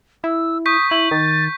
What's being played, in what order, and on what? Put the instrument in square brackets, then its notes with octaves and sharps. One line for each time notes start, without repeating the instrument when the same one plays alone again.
[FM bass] E4 [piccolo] E6
[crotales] C#6 G6 B6 [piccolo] D#6
[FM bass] E4 [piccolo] F#7
[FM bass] D#3 [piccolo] A6